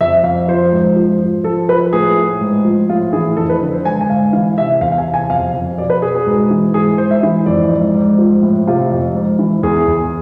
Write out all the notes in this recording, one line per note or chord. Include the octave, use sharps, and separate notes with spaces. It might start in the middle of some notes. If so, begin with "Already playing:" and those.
F2 E5
F2 F5
F3 C5
G#2
F3
F3
F3 A4
F3 B4
A2 G#4
A2
G#2
F3
A2 F4
E3 G#4
F2 A4
B4
D3
C5
G#2 G#5
G#5
G#2 F5
E3 F5
C3 E5
E2 F5
F5
G#5
C3
G#5
F2 F5
F2
B2 D5
B4
B2 G#4
G#4
G#2
E3
G#2 G#4
G#2 C5
E5
E3
F2 D5
G#2
G#2
F3
A2
C3 F4
F2
G#2
E3
E2 G#4
E2